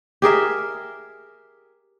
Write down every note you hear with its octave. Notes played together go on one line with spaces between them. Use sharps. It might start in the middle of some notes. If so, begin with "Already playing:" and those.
G4 G#4 A#4 E5